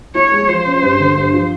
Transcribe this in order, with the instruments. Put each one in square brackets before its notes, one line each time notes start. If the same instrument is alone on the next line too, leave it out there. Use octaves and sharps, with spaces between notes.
[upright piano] E4 [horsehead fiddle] C#5
[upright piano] G#3
[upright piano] F3 [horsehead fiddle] C5
[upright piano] C#4
G2
D3
G2
F3